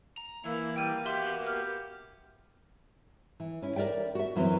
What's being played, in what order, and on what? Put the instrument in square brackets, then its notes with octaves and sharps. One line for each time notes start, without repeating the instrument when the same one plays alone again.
[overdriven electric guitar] A#5
[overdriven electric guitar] E3 [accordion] A#3 [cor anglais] E4
[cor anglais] G3 [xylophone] G5 D#7
[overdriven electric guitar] B3 F#4 [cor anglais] G4 [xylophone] E5 C6
[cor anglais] G4 [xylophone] F6
[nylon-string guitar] E3
C#4 E4
A#4 D5 E5 G5
F#4 E5
F#2 E3 F#3 C4